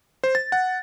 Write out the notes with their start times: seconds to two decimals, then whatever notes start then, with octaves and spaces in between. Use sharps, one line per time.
0.24 C5
0.35 A6
0.52 F#5